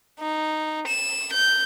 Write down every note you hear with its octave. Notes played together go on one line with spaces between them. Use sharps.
D#4
E7
G6